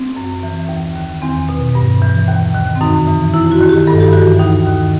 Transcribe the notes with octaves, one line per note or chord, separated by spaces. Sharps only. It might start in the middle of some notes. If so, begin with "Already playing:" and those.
Already playing: C4
F#2
E3
D#2
D#3
E2 C4
B2
G2
E3
D#2
D#3
C4
F#2 D#4
E3
F#2 E4
F#4
D#3
G4
G2 A4
G4
E3 F#4
D#2 D#4
D#3